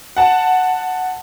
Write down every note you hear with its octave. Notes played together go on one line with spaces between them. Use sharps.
F#5 A5